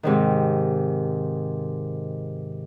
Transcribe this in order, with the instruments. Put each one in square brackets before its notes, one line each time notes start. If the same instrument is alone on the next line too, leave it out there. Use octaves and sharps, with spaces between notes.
[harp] G#2 C3 D#3